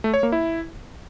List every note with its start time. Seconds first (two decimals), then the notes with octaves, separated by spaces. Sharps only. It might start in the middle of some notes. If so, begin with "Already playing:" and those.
0.04 A3
0.14 C#5
0.23 A#3
0.32 E4